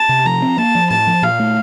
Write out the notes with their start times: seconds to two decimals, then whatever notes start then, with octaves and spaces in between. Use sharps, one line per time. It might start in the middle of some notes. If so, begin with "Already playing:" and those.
Already playing: A5
0.09 C3
0.25 F3 A#5
0.42 C4
0.58 A#3 A5
0.75 F3
0.90 A2 A5
1.07 F3
1.22 A#2 F5
1.39 A3